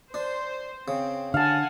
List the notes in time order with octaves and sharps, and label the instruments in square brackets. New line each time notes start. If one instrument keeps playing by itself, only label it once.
[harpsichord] D4 [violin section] C5
[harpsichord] C#3 [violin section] C4
[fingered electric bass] D3 [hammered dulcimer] F5 A5 [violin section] F#5 G#5